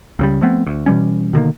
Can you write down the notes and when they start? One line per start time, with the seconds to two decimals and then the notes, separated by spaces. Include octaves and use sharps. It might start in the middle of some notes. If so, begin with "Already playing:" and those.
0.19 C#2 C#3 G3
0.41 F3 A3 B3 C4
0.67 D2
0.86 B2 E3 G3 C#4
1.33 B2 D3 D#3 A#3